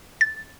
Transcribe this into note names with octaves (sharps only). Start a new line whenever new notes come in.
A6